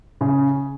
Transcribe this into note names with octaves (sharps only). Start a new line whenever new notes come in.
C#3